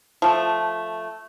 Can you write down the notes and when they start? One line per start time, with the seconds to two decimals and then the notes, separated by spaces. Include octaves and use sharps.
0.22 F3 A3